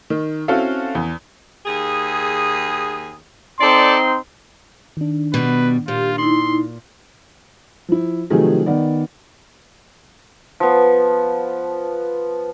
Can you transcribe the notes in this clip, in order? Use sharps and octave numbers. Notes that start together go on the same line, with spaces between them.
D#3
C4 C#4 E4 F#4 A4 F5
E2
D#2 G#4
C4 D#4 A4 D5 C6
D#3 D4
B2 G3 B4
A#2 F4 G4
D#4 E4 C6
F3 E4
C3 D#3 F3 F#3 A3 G#4
D#3 B3 D5
F3 B3